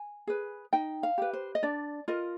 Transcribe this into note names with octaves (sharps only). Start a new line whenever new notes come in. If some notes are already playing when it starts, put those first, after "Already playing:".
Already playing: G#5
G#4 B4
D#4 G5
F5
G4 B4
C5
D#5
D4 D5
F4 A#4 D#5